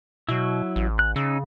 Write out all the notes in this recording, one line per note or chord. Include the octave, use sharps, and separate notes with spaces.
B2 F#3 E4
A1
F#6
C#3 C#4 D#4 E6